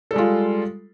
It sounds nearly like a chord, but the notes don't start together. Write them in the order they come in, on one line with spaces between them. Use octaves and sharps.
A4 G3 G#3 F4